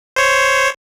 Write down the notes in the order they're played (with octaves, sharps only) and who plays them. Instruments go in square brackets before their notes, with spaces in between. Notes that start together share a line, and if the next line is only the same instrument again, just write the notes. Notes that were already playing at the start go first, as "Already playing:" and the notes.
[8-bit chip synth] C5 C#5